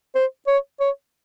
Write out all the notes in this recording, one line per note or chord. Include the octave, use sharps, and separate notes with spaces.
C5
C#5
C#5